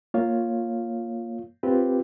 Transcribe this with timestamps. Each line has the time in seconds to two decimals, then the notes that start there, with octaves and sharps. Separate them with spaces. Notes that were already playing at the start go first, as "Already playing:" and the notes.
0.14 A#3 F4 C#5 F5
1.63 C4 F4 G4 B4